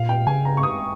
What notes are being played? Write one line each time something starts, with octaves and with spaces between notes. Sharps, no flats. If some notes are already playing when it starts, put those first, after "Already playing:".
Already playing: A#2 F5
G5
C#3 G#5
A#5
C#6
D#6